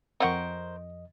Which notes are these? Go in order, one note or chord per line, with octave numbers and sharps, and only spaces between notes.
F2 C4 A#4 C5 D#5 F#5 C#6